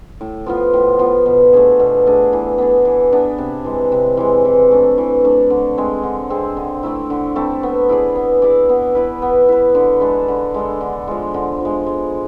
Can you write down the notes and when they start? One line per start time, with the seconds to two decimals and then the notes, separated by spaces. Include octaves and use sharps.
0.21 A2
0.46 F3 B3 F4
0.74 A2
0.99 F3 B3 F4
1.26 B2
1.53 A3 D4 G#4
1.79 B2
2.06 A3 D4 G#4
2.33 E3
2.58 B3 D4 G#4
2.85 E3
3.12 B3 D4 G#4
3.38 C3
3.64 E3 G#3
3.92 C3
4.17 E3 G#3
4.45 E3
4.71 A3 D4
4.98 E3
5.24 A3 D4
5.50 D3
5.77 G#3 C4 G#4
6.03 D3
6.30 G#3 C4 G#4
6.57 D3
6.83 A3 C4 E4
7.10 D3
7.36 A3 C4 E4
7.63 B3
7.89 E4 G#4 D5
8.16 B3
8.42 E4 G#4 D5
8.69 B3
8.95 E4 B4
9.22 B3
9.49 E4 B4
9.75 D3
10.01 G#3 D4 A4
10.28 D3
10.54 G#3 D4 A4
10.81 D3
11.08 F3 G#3
11.34 D3
11.61 F3 G#3
11.86 G#3